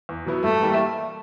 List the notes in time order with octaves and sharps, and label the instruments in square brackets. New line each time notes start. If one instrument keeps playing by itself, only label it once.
[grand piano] E2
B2 F#3 B3 E4
[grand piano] G2 [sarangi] A3
[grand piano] E3 G3 A#3